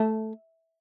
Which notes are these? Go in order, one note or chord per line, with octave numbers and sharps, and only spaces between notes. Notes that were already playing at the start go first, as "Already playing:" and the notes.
Already playing: A3